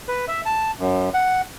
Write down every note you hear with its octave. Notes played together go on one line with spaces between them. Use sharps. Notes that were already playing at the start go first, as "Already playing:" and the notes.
B4
E5
A5
F#2
F#5